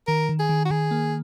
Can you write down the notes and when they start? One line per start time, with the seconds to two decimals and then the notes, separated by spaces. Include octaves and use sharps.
0.07 D#3 A#4
0.29 D#3
0.39 G#4
0.49 D#3
0.65 F#4
0.70 D#3 G#4
0.91 A#3